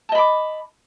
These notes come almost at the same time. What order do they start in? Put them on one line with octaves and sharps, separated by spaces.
A5 D#5 B5 D6